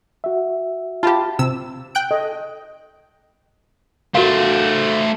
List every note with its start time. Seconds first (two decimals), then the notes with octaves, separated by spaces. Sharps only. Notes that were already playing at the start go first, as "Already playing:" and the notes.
0.24 F#4 E5
1.03 F4 G4 A5 B5
1.39 C3 E6
1.95 G5 F#6 D7
2.11 A4 D#5
4.15 A3 F#4 A#4 C5 F5